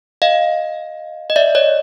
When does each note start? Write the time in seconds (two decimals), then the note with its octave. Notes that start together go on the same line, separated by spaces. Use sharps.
0.22 D#5 F5
1.30 D#5
1.36 D5 E5
1.55 C#5 D#5